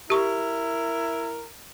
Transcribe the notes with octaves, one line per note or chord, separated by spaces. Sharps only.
E4 G4 A#4 C#6